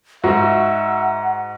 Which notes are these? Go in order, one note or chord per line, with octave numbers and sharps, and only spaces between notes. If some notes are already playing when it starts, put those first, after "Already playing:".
G#2 F#4 E5 F#5